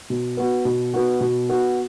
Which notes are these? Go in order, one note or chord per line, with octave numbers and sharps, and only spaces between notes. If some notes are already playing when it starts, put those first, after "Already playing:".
B2
B3 F#4
B2
B3 F#4
B2
B3 F#4